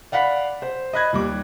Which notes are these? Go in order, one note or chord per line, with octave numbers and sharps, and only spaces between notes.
D5 F5 F#5 B5 B6
C5
D#5 B5 F#6 G#6 A#6
D#2 G3 D6